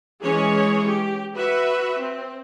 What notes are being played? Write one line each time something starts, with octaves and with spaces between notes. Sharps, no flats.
E3 G#3 C#4 G#4 C#5
G4
F#4 B4 E5
C4